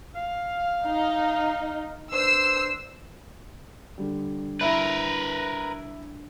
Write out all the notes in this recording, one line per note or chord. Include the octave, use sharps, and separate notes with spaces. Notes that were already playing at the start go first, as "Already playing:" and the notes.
F5
D#4
D4 B4 C5 E6 C7
D3 G3
E4 A#4 B4 E5